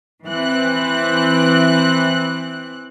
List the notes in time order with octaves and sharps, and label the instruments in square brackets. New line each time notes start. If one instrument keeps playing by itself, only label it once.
[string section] E3 C4 F#6